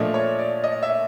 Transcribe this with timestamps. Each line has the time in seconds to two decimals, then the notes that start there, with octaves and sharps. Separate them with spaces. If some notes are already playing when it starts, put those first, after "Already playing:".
Already playing: A#2 F3 A3 D4 D#5
0.14 C#5
0.39 D5
0.64 D#5
0.83 E5